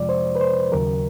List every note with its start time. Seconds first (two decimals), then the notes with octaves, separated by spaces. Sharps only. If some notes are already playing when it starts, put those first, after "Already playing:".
Already playing: F2 C3 F3 G#3 D5
0.09 C5
0.36 B4
0.41 C5
0.72 D#2 C#3 F#3 A#4